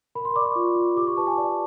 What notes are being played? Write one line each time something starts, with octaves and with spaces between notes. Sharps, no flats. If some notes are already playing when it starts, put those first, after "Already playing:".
A#4 B5
C6
D5 D6
C#6
F4
F4
G4 D6
C#6
B4 A5
G#5
D5